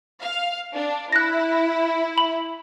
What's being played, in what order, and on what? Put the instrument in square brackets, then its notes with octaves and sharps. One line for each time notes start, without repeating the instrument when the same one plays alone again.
[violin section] F5
D4
[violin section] E4 [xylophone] F#6 A#6
[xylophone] B5